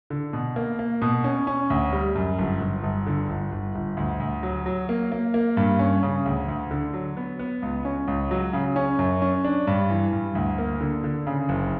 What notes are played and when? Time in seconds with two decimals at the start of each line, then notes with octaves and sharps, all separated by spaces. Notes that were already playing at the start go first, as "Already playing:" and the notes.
0.10 D3
0.33 B2
0.56 A#3
0.79 A#3
1.02 B2
1.24 C#4
1.47 C#4
1.70 D2
1.93 G3
2.15 F#2
2.38 G1
2.61 G1
2.83 G1
3.06 D3
3.29 G1
3.52 G1
3.75 G1
3.97 D2
4.20 D2
4.43 F#3
4.66 F#3
4.89 A#3
5.12 A#3
5.34 A#3
5.57 G2
5.79 C#4
6.03 C#3
6.26 D2
6.48 D2
6.71 D3
6.94 F#3
7.17 B3
7.39 B3
7.62 C#2
7.85 C#4
8.07 C#2
8.31 F#3
8.53 C#3
8.76 C#4
8.99 F#2
9.22 C#4
9.44 D4
9.67 G2
9.90 E3
10.13 G2
10.35 D2
10.58 A#3
10.81 D3
11.04 D3
11.27 C#3
11.49 F#1